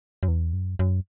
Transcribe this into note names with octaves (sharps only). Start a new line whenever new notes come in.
F#2
E2
F#2
F#2